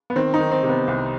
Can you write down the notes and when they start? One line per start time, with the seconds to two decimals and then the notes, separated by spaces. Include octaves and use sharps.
0.10 B3
0.16 D#3 C4
0.34 D#4
0.40 D#3
0.51 C4
0.63 C3
0.69 B3
0.88 C2